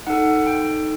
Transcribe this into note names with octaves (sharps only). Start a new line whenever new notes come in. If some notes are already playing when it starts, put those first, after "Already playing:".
D#4 A4 F#5
G5